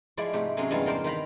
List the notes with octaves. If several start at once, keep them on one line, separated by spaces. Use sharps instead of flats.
F3 G#3 E4 A4 D5
G#2 C3 A3 G4
C3 F#3 A3 C#4 G#4 A#4
E2 G2 G3 G#3 A4 F5
A4 A#4 C5 D5 A5
D#3 F5 G5 A#5 B5